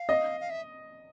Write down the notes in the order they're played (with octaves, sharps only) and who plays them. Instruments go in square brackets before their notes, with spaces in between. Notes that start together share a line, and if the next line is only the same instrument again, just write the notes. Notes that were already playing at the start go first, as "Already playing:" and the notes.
Already playing: [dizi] F5
[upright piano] D#5
[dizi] F5
E5